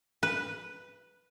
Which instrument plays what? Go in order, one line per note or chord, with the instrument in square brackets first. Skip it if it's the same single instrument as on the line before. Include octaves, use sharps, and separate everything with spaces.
[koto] B4